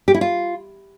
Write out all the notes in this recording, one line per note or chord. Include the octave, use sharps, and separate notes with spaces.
G4
E4
F4